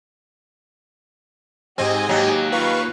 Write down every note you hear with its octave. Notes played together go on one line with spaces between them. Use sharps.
G#2 C4 G4 D#5 G#5
D#2 F#3 G4
F4 B4 F5 C#6